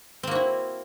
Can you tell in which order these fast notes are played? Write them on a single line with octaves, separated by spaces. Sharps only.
C4 A#3 F#4 E4